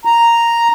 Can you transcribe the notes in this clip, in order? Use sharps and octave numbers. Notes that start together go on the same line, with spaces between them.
A#5